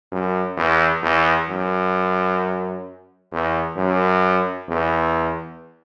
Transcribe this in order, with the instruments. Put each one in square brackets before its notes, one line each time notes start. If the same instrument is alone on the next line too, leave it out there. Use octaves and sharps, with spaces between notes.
[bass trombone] F#2
E2
E2
F#2
E2
F#2
E2